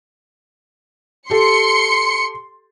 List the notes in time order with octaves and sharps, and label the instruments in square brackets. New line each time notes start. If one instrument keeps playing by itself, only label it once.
[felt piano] G4 A4 [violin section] C6 C#7